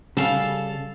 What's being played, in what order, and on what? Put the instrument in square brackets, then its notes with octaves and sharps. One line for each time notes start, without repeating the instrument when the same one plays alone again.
[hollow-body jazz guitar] C#3 G3 [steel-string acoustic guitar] A4 F5